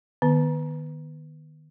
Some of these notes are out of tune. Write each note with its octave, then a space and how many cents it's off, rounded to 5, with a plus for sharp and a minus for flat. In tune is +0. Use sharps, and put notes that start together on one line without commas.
D#3 -25 B3 -15